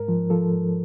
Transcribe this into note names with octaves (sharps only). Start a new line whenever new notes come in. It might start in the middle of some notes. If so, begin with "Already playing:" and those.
Already playing: G#2 A#4
F3
F3 A4
G#2